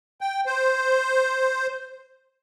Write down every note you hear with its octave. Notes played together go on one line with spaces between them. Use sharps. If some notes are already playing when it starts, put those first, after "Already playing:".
G5
C5